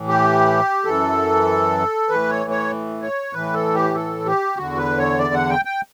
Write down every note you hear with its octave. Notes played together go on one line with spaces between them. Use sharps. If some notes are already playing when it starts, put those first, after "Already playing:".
Already playing: A2 E3
G4
F#2 E3 A4
A2 E3 B4
C#5
C#5
C#5
A2 E3 B4
A4
G4
A4
G4
E2 D3 F#4
B4
C#5
D5
F#5
G5
G5